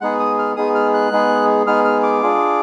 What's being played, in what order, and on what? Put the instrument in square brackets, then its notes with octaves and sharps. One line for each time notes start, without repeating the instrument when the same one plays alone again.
[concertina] G#3 B3 D#4 G#4 F#5
D#6
F6
G#3 B3 D#4 G#4 D#6
F6
F#6
G#3 B3 D#4 G#4
G#3 B3 D#4 G#4 F6
F6
D6
D4 F4 G#4